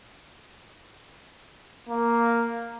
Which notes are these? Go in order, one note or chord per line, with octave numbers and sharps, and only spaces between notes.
A#3